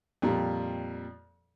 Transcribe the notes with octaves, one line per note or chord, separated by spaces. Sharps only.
F2 A#2 G3